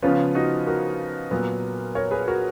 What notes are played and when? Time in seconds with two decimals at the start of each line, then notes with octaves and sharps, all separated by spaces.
0.02 C#3 F3 B3 C#4 F4
0.35 D#4 F#4
0.67 F#4 A#4
1.31 A#2 F#3 B3
1.95 A#4 C#5
2.11 G#4 B4
2.28 F#4 A#4